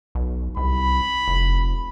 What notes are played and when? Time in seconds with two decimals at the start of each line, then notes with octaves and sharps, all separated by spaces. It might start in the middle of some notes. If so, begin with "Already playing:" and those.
0.15 B1
0.57 C2 B5
1.28 F1